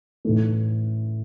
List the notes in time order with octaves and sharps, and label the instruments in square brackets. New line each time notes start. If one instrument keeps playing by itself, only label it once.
[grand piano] A2 E3 A3